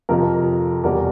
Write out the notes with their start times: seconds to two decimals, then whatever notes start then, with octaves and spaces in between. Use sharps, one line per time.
0.09 F2 C3 F3 A#4
0.84 E2 B2 G3 A#4